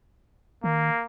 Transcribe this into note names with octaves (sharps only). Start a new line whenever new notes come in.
D#3 A#3